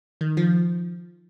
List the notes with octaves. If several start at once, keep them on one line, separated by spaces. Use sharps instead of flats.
D#3
F3